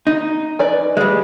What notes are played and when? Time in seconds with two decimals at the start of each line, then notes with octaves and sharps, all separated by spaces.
0.07 D#4
0.59 B4 D5 G#5
0.97 G3 G#3 F5